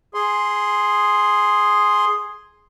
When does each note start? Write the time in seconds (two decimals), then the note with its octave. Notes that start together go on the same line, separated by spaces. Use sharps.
0.14 G#4 C6